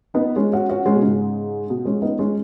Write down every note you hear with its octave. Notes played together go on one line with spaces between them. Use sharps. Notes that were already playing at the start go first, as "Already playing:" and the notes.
B3 D#4
G#3 C#4
C#4 F#4
C#4 F#4
G#3 C#4
B2
G#2 C#3
B2
G#3 C#4
B3 D#4
G#3 C#4